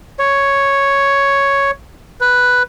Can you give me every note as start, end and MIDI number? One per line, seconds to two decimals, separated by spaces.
0.19 1.71 73
2.21 2.63 71